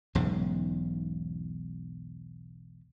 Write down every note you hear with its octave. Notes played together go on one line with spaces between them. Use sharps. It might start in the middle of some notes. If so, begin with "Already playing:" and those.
E1 B1 G#2 C#3